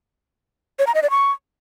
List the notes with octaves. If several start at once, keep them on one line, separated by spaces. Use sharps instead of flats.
C#5
A#5
D#5
D5
C#6